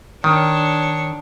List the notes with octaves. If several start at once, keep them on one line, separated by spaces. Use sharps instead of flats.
D#3 D4 C#5